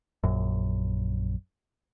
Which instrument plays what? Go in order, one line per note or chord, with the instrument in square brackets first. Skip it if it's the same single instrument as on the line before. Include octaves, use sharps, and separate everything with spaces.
[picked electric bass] A#1 F#2